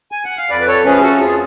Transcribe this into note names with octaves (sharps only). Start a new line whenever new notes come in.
G#5
F#5
F5
F2 B4 D5
B4
A4 C#5
F3 A3 C#4 G#4 B4
G#4
F#4 A4
F2 F4 G#4